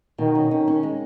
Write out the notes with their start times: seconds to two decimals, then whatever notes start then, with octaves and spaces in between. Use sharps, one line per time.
0.18 B2 D#3
0.35 C#4
0.51 D#3 C#4
0.68 C#4
0.83 G#3